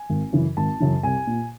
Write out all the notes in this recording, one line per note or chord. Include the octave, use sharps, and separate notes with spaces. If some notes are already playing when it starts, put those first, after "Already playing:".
Already playing: G#5
G#1
F#2 C#3 E3
G#1 A5
F#2 C#3 E3
C2 G#5
A#2